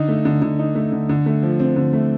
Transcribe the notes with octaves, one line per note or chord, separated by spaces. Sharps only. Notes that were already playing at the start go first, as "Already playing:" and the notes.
Already playing: D3 D#4
A3
D3
D3
D#4
A3
D3
D3
A3
F3
C4
D3
A3